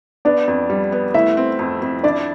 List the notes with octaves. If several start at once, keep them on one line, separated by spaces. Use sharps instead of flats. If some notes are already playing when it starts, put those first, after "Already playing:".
B3 D4 D5
F2
G3
B3
A3 E4 E5
C4
F2
F2
D4 E4 D5